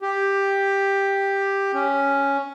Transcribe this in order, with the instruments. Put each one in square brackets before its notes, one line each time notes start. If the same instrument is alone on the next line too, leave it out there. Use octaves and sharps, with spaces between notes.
[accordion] G4
C#4